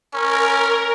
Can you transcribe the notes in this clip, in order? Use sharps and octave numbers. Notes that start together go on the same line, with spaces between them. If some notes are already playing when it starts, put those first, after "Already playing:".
C#4 A#4